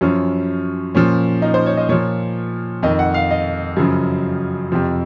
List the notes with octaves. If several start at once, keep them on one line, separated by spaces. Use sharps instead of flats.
F#2 F3 C#4
A#2 F3 C#4
D#4
C5
C#5
D#5
A#2 F3 C#5
F2 D#3 D#5
F#5
F5
D#5
F#2 C#3 F3
F2 C3 F3